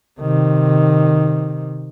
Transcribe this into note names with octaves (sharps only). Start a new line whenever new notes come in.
C3 D#3